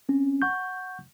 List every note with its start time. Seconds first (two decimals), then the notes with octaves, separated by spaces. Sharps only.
0.09 C4 C#4
0.42 F#5 C#6 G6